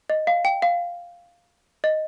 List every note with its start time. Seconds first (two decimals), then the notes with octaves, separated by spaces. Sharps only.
0.10 D#5
0.27 F5
0.45 G5
0.62 F5
1.84 D#5